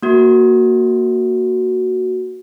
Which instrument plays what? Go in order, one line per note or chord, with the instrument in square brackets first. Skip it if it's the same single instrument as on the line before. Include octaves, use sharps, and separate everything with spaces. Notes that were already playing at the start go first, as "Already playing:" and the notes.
[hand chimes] A#3 F#4